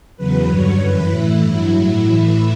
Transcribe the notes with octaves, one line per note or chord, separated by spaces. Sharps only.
E2 C#3 F#3 B4
G2 D3 F#3 C#5
F#2 E3 B4
A2 E3 E4
G2 F#3
A2 F#3
A2 E3 E4